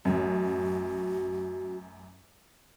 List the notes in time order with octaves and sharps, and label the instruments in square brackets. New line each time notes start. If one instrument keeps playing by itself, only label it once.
[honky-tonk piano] A1 F#2 [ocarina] F#4